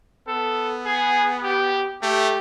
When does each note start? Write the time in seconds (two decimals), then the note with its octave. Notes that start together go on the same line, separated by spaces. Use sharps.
0.28 B3 A4
0.86 G#4
1.44 G4
2.02 A3 G4